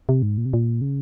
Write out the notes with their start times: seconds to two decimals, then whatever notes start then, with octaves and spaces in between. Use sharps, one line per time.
0.09 C3
0.22 G#2
0.38 A#2
0.45 C3
0.53 A#2
0.81 C#3